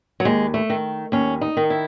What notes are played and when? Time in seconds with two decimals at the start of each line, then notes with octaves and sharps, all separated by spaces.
0.20 F#3
0.25 D#2 G#3
0.54 A3
0.70 D#3
1.12 D#2 C#4
1.41 D#4
1.57 D#3
1.70 E4